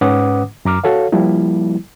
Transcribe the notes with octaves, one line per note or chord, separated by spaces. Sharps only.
G#2 C#4 B4 F#5 D6 D#6
F#2 A#5 D6 F6
F#4 A4 C#5 F5
F3 G3 A#3 E4